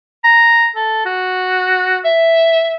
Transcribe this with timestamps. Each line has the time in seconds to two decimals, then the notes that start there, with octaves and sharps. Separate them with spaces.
0.24 A#5
0.76 A4
1.05 F#4
2.04 E5